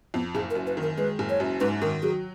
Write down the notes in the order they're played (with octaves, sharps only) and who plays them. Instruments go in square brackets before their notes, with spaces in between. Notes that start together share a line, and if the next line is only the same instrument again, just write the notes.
[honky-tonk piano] F2 [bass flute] B3
[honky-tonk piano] F#1 [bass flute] G#4
[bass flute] A#4
[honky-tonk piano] F#2
[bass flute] B4
[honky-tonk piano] D#3
[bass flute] A#4
[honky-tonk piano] G#3 [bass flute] B4
[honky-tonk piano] F#1
[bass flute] C#5
[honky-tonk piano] F#2
[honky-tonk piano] G#2 [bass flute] B4
[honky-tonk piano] D#3 [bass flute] A#4
[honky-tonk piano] F#3 [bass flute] G#4